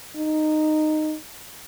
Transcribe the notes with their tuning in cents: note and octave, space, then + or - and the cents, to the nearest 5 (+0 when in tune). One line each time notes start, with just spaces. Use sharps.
D#4 -15